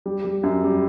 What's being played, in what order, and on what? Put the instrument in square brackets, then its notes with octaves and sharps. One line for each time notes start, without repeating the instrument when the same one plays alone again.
[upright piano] G3
G3
F#2
G3